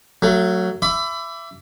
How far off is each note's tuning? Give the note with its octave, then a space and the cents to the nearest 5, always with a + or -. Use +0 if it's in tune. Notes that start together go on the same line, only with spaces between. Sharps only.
F#3 +0 A3 +30
E5 +25 B5 +25 D6 -15